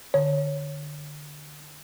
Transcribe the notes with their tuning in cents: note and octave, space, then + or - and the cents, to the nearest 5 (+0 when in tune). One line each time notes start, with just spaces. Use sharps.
D3 +15 C#5 +0